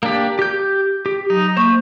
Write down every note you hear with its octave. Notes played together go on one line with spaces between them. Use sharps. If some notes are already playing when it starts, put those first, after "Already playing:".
A#3 D4 G4
G4 G6
G4
F#3 D#4
A#3 C5 C#6